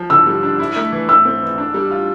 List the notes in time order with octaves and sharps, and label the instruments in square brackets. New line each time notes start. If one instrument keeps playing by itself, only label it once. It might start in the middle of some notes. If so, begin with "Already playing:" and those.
Already playing: [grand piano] F3
[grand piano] D3 [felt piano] E6
[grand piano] G3
D4
E4
A3
E3
[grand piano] A3 [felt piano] E6
[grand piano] C4
E3
D4
G3
F4